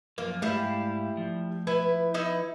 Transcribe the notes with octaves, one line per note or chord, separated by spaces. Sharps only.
F#2 F3 A#3
G#2 G3 A3 E4 F5
F3
E4 B4
D#4 E4 B4